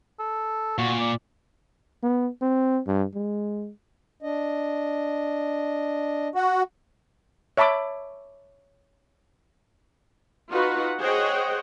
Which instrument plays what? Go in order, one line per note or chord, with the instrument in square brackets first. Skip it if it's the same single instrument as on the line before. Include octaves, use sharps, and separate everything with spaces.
[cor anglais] A4
[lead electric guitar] A#2 [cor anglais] F#4
[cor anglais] D5
[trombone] B3
C4
G2
G#3
[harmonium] D4 D#5
[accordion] F#4
[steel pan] C#5 E5 A5 B5 D6
[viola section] D#4 F4 F#4 B4 F#5
G#4 C5 C#5 D#5 F#5 G5